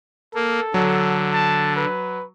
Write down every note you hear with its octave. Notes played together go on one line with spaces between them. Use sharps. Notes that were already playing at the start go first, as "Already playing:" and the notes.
A#3 A4
D3 F#3
A5
B4